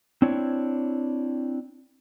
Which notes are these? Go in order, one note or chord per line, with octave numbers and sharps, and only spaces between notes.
C4 D4 E4 C#5